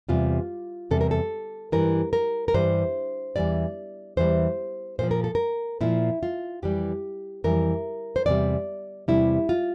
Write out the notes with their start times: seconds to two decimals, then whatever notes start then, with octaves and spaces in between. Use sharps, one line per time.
0.09 E2 C3 G3 F4
0.91 E2 C3 G3 A4
1.01 A#4
1.11 A4
1.72 G2 E3 G3 A#4
2.13 A#4
2.48 A#4
2.54 G2 E3 G3 C5
3.36 E2 E3 G3 D5
4.17 E2 E3 G3 C5
4.99 A#2 F3 C5
5.11 A#4
5.24 A4
5.35 A#4
5.81 A#2 F3 E4
6.23 F4
6.63 F2 E3 G3 G4
7.44 F2 E3 G3 A#4
8.16 C5
8.26 E2 C3 G3 D5
9.08 E2 C3 G3 E4
9.49 F4